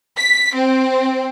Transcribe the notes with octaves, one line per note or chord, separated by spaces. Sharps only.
B6
C4